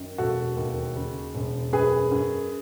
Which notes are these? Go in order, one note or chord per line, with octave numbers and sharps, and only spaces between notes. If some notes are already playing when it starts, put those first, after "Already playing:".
Already playing: F#2 D#3
E1 F#4 A4
D#2
C#3
E1
F#2 G#4 B4
F#2